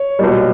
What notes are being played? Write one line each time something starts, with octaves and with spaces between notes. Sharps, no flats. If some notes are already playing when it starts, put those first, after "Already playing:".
Already playing: C#5
B1 A#2 G3